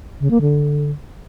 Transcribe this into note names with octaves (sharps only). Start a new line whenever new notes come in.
C#3
A#3
D3